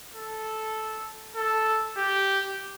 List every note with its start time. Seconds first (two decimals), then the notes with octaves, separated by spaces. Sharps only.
0.14 A4
1.36 A4
1.97 G4